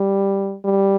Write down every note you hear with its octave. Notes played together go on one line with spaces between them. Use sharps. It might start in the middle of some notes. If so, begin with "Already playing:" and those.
Already playing: G3
G3